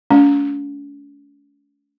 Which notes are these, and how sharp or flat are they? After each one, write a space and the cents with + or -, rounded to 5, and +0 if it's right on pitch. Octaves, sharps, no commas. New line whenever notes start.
A3 -30 C#4 +45